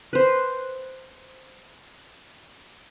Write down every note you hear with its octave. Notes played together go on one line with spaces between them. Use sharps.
B4 C5